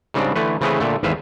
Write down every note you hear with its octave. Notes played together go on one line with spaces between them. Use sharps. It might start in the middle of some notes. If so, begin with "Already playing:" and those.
G#2 C#3 G3 C4 D4
D3 E3 A3 B4
C#3 E3 A3 C4 G#4 B4
A#2 D3 A3
G#1 E2 B4 C5 E5 F5